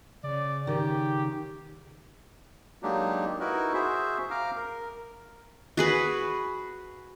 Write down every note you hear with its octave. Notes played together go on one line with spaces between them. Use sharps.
C#3 D5
D#3 G4
F#3 G#3 A#3 D4 D#4 G4
D#4 E4 F#4 A#4 B4
F#4 G#4 C5 E5
F5 A#5 D6 F6
A#4
F#4 G#4 B4